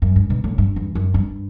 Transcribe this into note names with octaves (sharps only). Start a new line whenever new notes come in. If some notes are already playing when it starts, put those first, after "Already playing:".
F#2
G2
B2
A2
G2
E2
F#2
G2